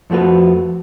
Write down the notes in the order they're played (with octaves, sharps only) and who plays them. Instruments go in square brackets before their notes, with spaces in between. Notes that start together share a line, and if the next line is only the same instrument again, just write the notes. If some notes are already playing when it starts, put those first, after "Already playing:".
[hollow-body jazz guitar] F2 F3 A3 F#4 B4